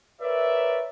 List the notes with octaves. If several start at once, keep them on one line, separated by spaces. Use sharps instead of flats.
A#4 B4 C#5 D5 E5